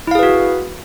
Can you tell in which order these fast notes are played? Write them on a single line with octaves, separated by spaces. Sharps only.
E4 F5 G#4 B4 F#4